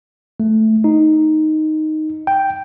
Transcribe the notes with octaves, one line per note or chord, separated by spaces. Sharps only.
A3
D#4
G5